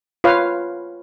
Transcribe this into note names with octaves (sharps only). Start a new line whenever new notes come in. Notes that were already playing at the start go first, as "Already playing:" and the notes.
F4 B4 C#5 F5